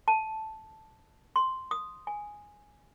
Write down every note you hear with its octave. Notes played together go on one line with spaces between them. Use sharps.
A5
C6
D#6
G#5